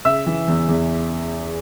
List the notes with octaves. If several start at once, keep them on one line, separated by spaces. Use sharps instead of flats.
C#3 E5 E6
E3
E2
E2